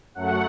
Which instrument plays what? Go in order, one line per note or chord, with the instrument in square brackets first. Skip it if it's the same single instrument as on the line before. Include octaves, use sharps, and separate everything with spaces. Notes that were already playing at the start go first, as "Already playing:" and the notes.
[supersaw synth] F#2 F#3 A3 F#5